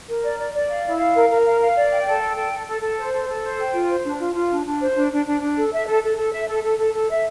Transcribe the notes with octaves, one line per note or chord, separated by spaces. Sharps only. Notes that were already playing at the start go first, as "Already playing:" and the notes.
A#4
D5
D5
D5
F5
E4
F5
A#4
A#4
F5
F5
D5
G5
A4
G5
A4
A4
A4
A4
C5
A4
A4
C5
G5
F4
C5
D4
F4
F4
D4
D4
C5
D4
D4
D4
D4
A4
E5
A4
A4
A4
E5
A4
A4
A4
A4
E5